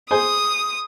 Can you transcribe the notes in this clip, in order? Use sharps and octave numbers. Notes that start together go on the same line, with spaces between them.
G#4 C5 G#5 D#6